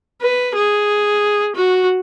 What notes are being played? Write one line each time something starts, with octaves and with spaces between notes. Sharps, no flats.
B4
G#4
F#4